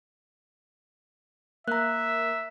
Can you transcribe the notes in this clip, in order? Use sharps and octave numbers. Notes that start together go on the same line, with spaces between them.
A#3 E5 A#5 F#6